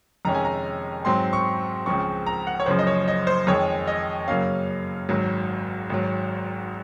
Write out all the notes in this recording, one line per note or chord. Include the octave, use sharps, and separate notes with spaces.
F2 C3 D#3 G#3 C#4 A#5
G#5
A#5
G#2 F#3 C4 C6
C#6
C#2 C#3 F3 C4 C#6
A#5
F#5
C#5
F#1 F#2 C#3 F3 C5
D#5
C#5
D#5
C5
F2 D#3 G#3 C#5
D#5
F#2 C#3 F#3 A#3 C#4 F5
G#1 G#2 F#3
G#1 G#2 F#3